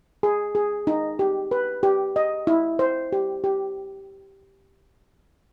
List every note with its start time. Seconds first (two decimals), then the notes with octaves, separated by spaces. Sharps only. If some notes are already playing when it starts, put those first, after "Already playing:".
0.23 G#4
0.55 G#4
0.87 D#4
1.19 G4
1.51 B4
1.83 G4
2.16 D#5
2.47 E4
2.79 C5
3.12 G4
3.44 G4